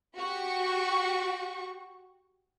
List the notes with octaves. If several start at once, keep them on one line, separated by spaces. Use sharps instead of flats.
F#4 G4 C#6